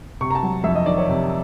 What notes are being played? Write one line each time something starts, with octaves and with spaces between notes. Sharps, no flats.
C3 C#6
A#5
A5
F#3
F2 E5
D#5
D#3 D5
C#5
C3